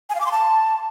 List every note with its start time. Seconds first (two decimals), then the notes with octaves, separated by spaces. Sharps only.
0.09 G#5
0.15 F5
0.20 D6
0.26 C6
0.31 A5